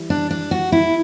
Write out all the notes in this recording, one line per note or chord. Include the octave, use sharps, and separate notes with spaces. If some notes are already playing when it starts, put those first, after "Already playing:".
Already playing: E3 G3
D4
D4
F#4
E4